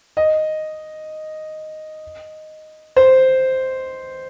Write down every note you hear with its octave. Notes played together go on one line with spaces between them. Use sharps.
D#5
C5